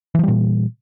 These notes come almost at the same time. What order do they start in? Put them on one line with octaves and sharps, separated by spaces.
E3 F3 G3 A#2